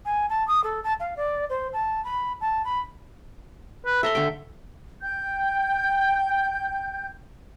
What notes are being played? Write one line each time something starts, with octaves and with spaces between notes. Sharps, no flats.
G#5
A5
D#6
A4
A5
F5
D5
C5
A5
B5
A5
B5
B4
A4 E5 A#5 C6
D3 A3 G5
G5 G6